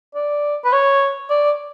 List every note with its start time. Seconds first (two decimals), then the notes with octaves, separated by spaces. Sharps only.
0.15 D5
0.64 B4
0.73 C#5
1.30 D5